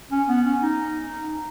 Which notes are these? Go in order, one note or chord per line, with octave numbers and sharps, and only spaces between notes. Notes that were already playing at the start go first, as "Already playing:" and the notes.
C#4
B3
C#4
D#4